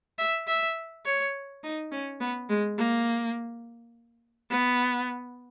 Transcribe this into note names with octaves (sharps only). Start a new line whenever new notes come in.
E5
E5
C#5
D#4
C#4
B3
G#3
A#3
B3